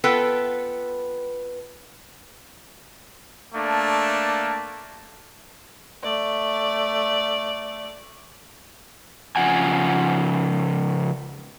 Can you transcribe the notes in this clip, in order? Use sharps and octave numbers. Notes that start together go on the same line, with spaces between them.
B3 F4 A4 B4 G5
A3 A#3 D4 A5
A3 D5
C#3 F3 F#5 G#5